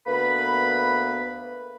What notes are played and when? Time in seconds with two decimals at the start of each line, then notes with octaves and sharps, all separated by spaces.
0.07 D2 A#3 B3 B4 B5